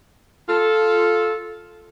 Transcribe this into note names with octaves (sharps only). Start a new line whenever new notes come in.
F4 A4